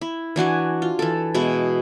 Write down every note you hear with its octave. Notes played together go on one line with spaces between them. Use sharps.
E4
E3 D4 F#4 G#5
F4
E3 A4
B2 G#3 E4